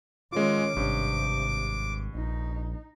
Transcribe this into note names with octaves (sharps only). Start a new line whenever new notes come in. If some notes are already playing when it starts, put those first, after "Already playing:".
D#3 G#3 C#4 F4 D6
G#1 G2 C3
A#1 D#4